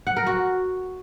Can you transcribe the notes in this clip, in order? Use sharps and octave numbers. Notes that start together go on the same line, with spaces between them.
F#5
A#4
F#4